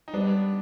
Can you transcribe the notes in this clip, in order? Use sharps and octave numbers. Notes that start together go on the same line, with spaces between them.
D#4
G3 B3 D4